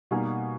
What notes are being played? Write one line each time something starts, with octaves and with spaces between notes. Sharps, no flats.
B2 G3 A#3 D#4 G#5